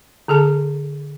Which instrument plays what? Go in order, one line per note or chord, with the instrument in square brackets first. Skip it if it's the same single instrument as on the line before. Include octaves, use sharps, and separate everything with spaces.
[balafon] D3 G#4 A4 A5